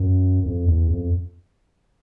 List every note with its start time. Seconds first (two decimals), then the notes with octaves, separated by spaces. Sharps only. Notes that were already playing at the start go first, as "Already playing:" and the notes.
Already playing: F#2
0.46 F2
0.68 E2
0.90 F2